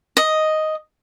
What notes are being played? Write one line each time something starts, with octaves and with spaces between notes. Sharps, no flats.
D#5